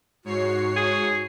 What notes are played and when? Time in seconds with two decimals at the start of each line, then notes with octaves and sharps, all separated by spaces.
0.25 G#2 F#4 C#5 C7
0.76 G#4